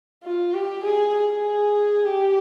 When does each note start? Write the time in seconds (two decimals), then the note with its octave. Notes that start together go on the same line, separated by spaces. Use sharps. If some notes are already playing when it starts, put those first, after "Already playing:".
0.24 F4
0.54 G4
0.84 G#4
1.15 G#4
2.05 G4